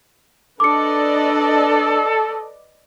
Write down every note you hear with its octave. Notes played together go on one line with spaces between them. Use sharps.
D4 A4 B4 D5 D#5 D6 C#7